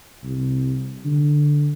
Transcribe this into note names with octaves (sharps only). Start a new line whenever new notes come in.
C2
D3